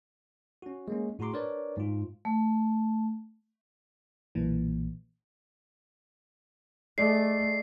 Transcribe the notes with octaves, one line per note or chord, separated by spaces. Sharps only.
C#4 F#4
G#3 A#3 C#4
A2 F#4 G#4 A#5 C6 D6
D4 A#4 B4 C#5 D5
G#2 F4
A3
B1 A#2 E3
A3 G#4 D5 D#5 C7